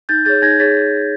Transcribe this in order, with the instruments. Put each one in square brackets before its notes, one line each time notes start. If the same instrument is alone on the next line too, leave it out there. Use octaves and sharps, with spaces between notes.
[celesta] D#4 G6 A6
G#4 C#5 G6 A6
D#4 G#6 A#6
G#4 C#5 A6 B6